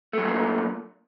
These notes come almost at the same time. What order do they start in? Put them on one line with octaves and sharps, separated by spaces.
A3 F#3 A#2 A#3